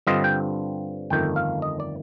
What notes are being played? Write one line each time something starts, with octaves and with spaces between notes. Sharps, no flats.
G2 D3 G3 C4 F4 D#5
G5
G1 F2 D#3 A3 G5
F5
D#5
D5